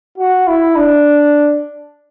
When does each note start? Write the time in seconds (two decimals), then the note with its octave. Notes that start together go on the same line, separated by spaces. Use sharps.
0.18 F#4
0.48 E4
0.76 D4